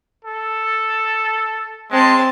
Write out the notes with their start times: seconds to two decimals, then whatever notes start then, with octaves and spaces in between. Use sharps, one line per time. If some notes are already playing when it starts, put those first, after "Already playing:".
0.25 A4
1.91 G#3 C4 A5